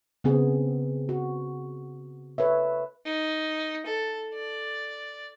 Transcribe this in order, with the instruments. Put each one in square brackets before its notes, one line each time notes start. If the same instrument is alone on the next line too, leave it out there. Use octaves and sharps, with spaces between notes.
[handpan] C#3 B3 C4 G#4
F#4
A4 B4 C#5 E5
[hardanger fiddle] D#4
A4
D5